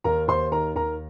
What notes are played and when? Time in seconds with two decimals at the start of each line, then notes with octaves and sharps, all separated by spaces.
0.04 D#2 A#4 A#5
0.28 D#2 C5 C6
0.52 D#3 A#4 A#5
0.76 D#2 A#4 A#5